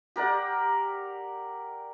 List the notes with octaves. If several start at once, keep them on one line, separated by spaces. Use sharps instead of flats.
G4 A#4 D5 F#5